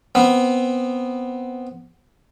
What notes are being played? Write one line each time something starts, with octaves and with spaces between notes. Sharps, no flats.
B3 C4